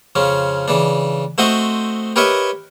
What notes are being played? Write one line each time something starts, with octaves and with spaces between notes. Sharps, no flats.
F2 C#3 F3 C#4
C#3 E3 D4
A3 C4 F#4 C5 D#5 E5
G4 A#4 B4 C#5 D#5 E5